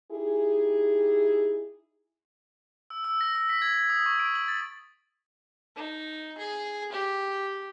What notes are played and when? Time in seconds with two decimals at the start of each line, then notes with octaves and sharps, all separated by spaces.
0.11 D#4 E4 G4 G#4
2.90 E6
3.04 E6
3.21 A#6
3.35 E6
3.49 B6
3.62 G#6
3.75 G#6
3.90 D#6
4.06 C#6
4.20 D7
4.35 F#7
4.48 A6
5.76 D#4
6.38 G#4
6.92 G4